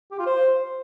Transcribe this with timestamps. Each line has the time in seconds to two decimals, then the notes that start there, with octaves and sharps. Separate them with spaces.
0.12 G4
0.19 F4
0.26 C5